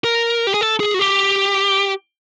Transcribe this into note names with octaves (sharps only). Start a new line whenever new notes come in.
A#4
G4
G#4
A4
G#4
F#4
G4